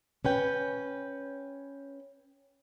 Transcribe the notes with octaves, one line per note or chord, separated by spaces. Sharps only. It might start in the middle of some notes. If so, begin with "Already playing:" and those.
C#4 B4 G5